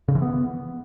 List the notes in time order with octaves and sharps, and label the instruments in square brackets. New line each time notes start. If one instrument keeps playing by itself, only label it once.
[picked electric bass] C#3
E3
B3